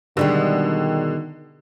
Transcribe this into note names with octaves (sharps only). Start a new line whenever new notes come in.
B2 D3 D#3 G3 G#3